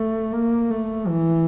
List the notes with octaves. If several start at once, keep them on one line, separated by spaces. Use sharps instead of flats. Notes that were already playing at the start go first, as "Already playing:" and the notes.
Already playing: A3
A#3
A3
E3